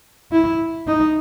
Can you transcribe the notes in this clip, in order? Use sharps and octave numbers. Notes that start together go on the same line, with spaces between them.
E4
D#4